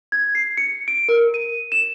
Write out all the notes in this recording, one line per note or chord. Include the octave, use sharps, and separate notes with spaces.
G#6
C7
C#7
D7
A#4
D#7
E7